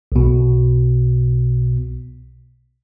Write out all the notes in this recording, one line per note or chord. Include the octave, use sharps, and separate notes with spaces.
B1 B2